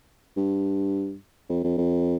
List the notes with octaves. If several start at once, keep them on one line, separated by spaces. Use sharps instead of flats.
G2
F2
F2
F2